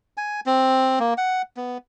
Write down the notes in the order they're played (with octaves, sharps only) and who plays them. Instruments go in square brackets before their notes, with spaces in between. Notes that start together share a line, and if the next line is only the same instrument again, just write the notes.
[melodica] G#5
C4
A#3
F#5
B3